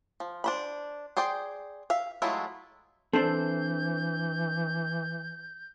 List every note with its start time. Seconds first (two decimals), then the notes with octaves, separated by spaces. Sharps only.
0.20 F3
0.44 D4 C5 B5
1.17 G#4 C5 D5 G5
1.90 E5 F5
2.22 F#3 G#3 A3 E4 F4
3.14 E3 C4 D4 A4 C5 G6